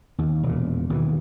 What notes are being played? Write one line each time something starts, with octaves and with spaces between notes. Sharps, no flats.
D#2
E1 A#2
D#2 B2 D3 E3